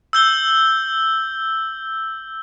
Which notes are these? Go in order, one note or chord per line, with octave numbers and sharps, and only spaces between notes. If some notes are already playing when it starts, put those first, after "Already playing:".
E6 G6 G7